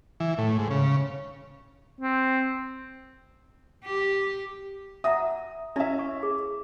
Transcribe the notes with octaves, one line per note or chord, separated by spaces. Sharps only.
E3
A2
G#2
C#3
C4
G4
E5 F#5 A#5 D#6
C#4 E4 E5
C#6
G#4